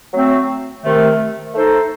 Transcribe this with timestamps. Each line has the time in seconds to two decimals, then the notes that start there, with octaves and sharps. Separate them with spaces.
0.12 F#3 A3 C4
0.82 C3 D#3 A3
1.54 A3 D#4 A4 C5